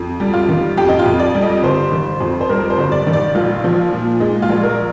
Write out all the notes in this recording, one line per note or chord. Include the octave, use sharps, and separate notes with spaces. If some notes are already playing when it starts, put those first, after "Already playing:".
Already playing: F2
G3
F4
D#3
F2 G4
D#4
F4
F2
D5
G3
D#5
G1 C5
D#3
F2
C5
G3 A#4
C5
G1
D5
D#3
D5
A#1 F4
F3
A#2
G#3 D#4
F4
A#1
A#4